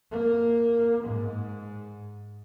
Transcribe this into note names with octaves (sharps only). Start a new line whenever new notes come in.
A#3
G#2